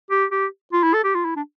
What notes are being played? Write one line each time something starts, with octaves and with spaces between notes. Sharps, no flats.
G4
G4
F4
E4
A4
G4
F4
E4
D4